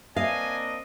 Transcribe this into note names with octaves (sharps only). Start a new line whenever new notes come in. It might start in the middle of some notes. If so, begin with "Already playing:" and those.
A#3 C4 D4 D#5 F5 G#5